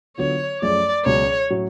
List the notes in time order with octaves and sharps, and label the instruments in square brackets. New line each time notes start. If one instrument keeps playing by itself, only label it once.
[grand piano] D3 F#3 B3 F4 [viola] C#5
[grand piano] F#2 F3 A3 C#4 G#4 [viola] D5
[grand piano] C#2 B2 F#3 [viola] C#5
[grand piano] A2 F#3 C#4